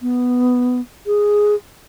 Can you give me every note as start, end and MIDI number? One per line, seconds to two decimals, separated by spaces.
0.01 0.81 59
1.06 1.55 68